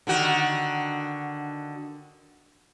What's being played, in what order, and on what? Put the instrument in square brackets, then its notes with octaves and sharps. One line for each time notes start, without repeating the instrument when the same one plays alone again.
[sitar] D3 D#3 F#4